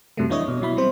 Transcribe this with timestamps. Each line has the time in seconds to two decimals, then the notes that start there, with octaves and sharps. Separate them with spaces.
0.17 F#2 C3 F#3 G3 A3
0.30 E3 D4 E4 C#5 D#5
0.48 B2
0.61 B2 F#3 E4 B5
0.77 G3 C4 C5